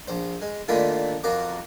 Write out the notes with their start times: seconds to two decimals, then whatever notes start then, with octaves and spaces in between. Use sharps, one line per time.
0.07 A#1 C5
0.42 G#3
0.68 A#2 D3 D#3 A3 E4 F4
1.23 F2 F4 F#4 A#4 D6